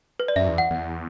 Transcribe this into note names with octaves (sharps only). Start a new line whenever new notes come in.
B4
D5
F#2 E5
E2
F#5
E2